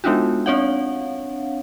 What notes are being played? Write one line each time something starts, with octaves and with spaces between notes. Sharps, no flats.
G#3 B3 D4 D#4 F4 F#4
C4 D4 C#5 F5 F#5